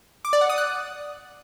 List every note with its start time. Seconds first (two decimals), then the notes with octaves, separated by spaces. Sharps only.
0.25 D6
0.33 D5
0.41 F#5
0.49 D#6
0.58 F#6